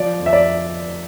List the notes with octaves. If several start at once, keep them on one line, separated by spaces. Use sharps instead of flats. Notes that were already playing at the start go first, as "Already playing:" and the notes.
Already playing: F3 D5
F2
E5
D5